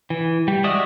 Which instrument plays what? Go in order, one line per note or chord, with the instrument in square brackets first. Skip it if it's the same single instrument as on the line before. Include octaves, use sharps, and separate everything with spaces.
[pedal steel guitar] E3
G3
G#3 F#4 D5 E5 D#6